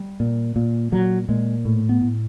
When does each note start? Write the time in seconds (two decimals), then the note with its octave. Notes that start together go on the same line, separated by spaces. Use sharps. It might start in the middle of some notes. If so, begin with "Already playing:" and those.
Already playing: G3
0.20 A#2
0.56 A#2
0.92 A#2 F#3
1.29 A#2 G#3
1.65 A2
1.89 B3
2.01 A2